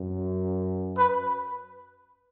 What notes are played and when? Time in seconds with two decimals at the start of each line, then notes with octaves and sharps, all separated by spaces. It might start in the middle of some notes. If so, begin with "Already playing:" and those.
Already playing: F#2
0.98 B4